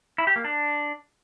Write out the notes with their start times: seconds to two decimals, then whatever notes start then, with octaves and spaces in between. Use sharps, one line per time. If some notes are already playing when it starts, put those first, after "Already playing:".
0.18 E4
0.27 G4
0.36 A#3
0.44 D4